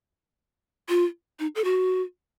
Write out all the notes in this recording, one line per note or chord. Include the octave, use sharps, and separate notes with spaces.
F4
D#4
A4
F#4